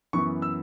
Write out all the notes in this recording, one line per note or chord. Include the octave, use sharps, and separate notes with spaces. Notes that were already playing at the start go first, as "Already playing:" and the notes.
F#2 E3 B3 C#6
E6